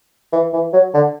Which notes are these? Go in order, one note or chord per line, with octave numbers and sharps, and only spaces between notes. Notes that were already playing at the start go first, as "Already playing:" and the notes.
E3
E3
F#3
D3